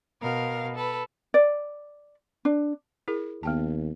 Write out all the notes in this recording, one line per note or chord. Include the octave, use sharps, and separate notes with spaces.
B2 A#4 F5
A4 B4
D5
D4
E4 G#4 A#4
D#2 B3 G5 A5